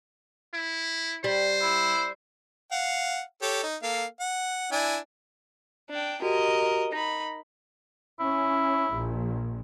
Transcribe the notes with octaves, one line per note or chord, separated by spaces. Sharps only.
E4
G3 C5
E4
F5 F#5
G4 A4 C#5
D#4
A#3 A4 F5
F#5
D4 E4 G#5
D4 G5
F#4 G4 A#4 D#5
D#4 B5 A#6
C#4 E4
A#1